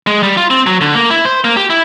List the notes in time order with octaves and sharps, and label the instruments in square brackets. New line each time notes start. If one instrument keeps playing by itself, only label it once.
[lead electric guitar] G#3
G3
F4
C4
F#3
D3
A#3
E4
C5
A#3
G4
E4